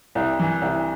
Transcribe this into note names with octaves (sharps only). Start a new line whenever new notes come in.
C2
E3
C2